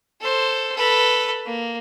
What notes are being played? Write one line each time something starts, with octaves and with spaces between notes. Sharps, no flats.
A4 C5
A4 B4
A#3